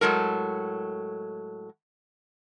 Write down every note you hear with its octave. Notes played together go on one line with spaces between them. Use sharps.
A2 F#3 G#3 A4 A#4